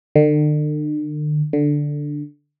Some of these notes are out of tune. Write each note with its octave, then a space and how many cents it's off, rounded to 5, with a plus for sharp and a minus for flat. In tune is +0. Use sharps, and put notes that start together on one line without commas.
D3 +40
D3 +0